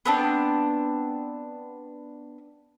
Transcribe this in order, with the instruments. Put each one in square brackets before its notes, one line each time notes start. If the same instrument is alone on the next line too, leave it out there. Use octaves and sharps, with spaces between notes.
[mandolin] B3 C4 D4